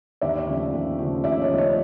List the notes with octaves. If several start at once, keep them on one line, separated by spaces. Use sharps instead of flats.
D#2 D5 E5
C#3 F3 A3
D#2
C#3 F3 A3
D#2 D5 E5
C#5 D#5
C#3 F3 A3
C#5 D#5